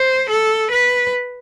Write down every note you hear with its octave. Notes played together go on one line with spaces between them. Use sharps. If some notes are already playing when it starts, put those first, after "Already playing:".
Already playing: C5
A4
B4